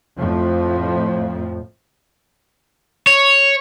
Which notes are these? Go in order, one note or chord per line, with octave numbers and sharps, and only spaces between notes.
F2 A2 F3
C#5